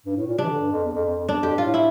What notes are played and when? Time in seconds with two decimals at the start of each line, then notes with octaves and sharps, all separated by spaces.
0.06 G2
0.17 A2
0.27 A#2
0.38 C3 D4
0.44 E3
0.49 D3
0.60 G2
0.71 F2
0.83 E2
0.94 F2
1.06 F2
1.16 F2
1.28 E2 D4
1.40 F2 G4
1.51 G2
1.58 A2 F4
1.74 E4